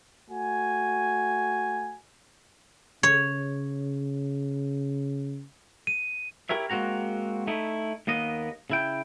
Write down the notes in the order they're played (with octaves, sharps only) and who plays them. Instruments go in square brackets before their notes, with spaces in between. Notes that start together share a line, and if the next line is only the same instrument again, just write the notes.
[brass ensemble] A3 F#4 G#5
[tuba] C#3 [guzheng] C#5
[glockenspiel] D#7
[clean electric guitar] E4 G4 A#4 C#5 E5
G#3 A#3 C4 F#4 A#5
A3 D#4 E4
D#2 A#3 B3 D#5
C#3 E4 G5